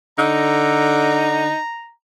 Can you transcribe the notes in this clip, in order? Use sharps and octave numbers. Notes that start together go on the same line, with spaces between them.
D3 D#4 A#5